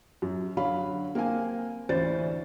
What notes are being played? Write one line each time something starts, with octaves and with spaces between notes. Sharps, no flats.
F#2
D3 F#3 C#5 F5 B5
A#3 C4 F5 G#5
D2 E3 C#4 C5 D5 A6